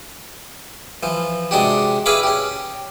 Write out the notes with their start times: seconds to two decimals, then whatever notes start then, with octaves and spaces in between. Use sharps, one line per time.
1.03 E3 F3
1.51 C3 G#3 D4 F#4 G4
2.06 E4 G#4 B4 F5 B5 D6
2.23 C#4 G4